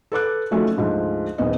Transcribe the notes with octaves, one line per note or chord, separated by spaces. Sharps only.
A4 B4 D6 F#6
F3 A3 A#3 C#4 D#4 F#4
D2 G#2 F3
D#1 E2 A#2 B3 D#5